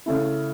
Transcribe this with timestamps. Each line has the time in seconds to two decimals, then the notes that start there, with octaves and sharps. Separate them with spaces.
0.06 C#3 A3 E4